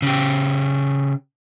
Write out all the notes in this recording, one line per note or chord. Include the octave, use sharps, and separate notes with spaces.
C#3 G4